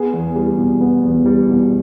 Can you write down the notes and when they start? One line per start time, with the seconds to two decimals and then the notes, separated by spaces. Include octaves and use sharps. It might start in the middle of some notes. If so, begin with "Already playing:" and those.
Already playing: B3 G#4
0.14 E2
0.36 G3
0.58 B2
0.81 B3
1.04 E2
1.26 G3
1.49 B2